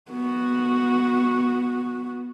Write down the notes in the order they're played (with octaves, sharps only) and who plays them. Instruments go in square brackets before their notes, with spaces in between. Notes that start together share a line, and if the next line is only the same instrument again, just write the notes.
[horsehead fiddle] B3 F#4